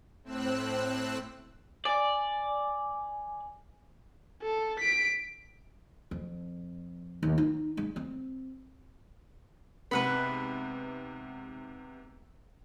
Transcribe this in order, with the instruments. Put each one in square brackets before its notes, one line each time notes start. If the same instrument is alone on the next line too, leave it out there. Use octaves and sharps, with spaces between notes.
[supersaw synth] A2 C4 E6 F#6
[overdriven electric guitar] D5 [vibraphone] G#5
[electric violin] A4
B6 D7
[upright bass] F2
D#2
D#4
G#3
C4
[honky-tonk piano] G#2 C3 B3 [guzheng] B4 F#5 B5